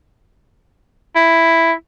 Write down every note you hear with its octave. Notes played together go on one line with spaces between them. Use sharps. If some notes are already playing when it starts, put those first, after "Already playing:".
E4